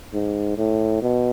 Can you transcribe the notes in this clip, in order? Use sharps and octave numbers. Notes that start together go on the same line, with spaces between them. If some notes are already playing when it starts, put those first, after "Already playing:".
G#2
A2
B2